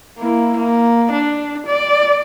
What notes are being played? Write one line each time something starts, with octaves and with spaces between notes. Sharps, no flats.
A#3 E4
A#3
D4
D5